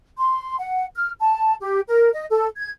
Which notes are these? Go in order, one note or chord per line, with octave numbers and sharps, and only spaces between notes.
C6
F#5
F6
A5
G4
A#4
D#5
A4
G#6